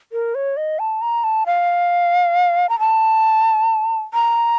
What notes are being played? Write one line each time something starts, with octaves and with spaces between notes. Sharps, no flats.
A#4
C#5
D#5
A5
A#5
A5
F5
A#5
A5
A#5